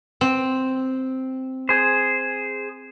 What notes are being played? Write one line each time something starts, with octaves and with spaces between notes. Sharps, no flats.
C4
G#4 C5